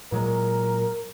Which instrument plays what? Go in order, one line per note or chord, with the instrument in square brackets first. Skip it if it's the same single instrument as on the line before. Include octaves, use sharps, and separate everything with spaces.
[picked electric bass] A#2 F#3 G#3 [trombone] A#4